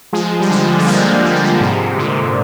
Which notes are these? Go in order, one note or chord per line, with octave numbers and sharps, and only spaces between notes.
F3 G#3
G3
D3 F3
G#3
G3 A#3
G#3
A#3
F3 G#3
G#2 C3
A#2 D3